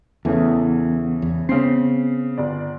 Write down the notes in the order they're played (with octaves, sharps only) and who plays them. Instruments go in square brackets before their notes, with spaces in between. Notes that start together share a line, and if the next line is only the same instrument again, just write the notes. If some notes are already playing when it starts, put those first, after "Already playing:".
[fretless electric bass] E2 [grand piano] C#3 E3 A3
[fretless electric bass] E2
[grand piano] C#3 C7 [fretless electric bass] B3 C4
[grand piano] G1 D5